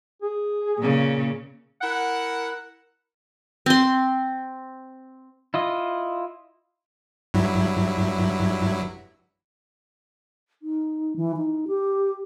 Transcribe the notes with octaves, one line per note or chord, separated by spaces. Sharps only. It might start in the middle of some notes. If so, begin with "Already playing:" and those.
G#4
A#2 C#3
E4 A#4 F#5
C4 C6
E4 F4 D#5
G2 F#3 E4
D#4
E3
D#4
G4